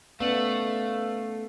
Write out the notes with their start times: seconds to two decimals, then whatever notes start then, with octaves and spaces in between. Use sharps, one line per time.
0.20 A3 B3 C#4 B4 D5 F5 F#5 F#7